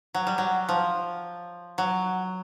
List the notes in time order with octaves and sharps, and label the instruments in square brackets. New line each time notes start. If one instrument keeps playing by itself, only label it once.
[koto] F#3
G3
F#3
F3
F#3